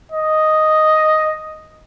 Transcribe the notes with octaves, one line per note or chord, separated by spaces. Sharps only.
D#5